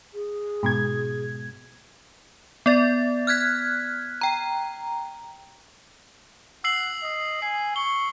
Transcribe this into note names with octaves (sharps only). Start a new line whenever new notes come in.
G#4
G#2 B2 G#6
B3 D5 A6
F6 F#6 G#6 B6
G5 A#5
F#5 E6 C7 F#7
D#5
G#5 C7
C#6 G7